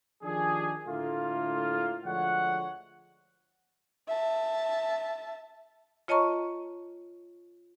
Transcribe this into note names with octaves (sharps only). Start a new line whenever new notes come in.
D#3 F3 D4 G4 G#4
A2 D3 A3 A#3 F4
D2 F3 G#3 C#5 F#5
E5 A5
F4 C#5 D#5 A5 A#5 C#6